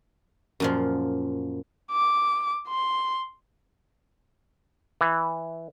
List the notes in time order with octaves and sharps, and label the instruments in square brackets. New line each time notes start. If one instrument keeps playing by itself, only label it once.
[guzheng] F#2 A#2 F3
[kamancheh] D6
C6
[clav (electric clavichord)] E3